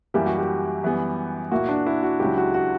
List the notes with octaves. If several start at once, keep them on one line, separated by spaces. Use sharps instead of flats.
F#2 E3 G3 A#3 E4 G4
F#4
G4
F#2 E3 G3 B3
A#2 A#3 E4 F#4
D4
E4
F#4
C#2 C#3 F#3 G4
F#4
F#4